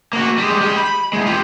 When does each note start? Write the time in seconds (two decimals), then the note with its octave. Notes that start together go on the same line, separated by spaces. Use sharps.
0.13 A#3 F#4
0.38 G3 G#3
0.61 G#3 G4
0.77 B5
1.13 E2 G#3
1.27 F4 G4